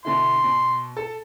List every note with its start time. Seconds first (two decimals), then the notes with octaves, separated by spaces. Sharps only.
0.05 B2 D3 E4 C6
0.44 B2
0.97 A4 A5